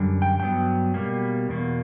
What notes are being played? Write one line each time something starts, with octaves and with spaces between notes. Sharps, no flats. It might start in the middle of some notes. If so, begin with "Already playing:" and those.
Already playing: F#2 D3 G3
G5
G2 F#3 B3 G5
B2 G3 A#3
E2 B2 A#3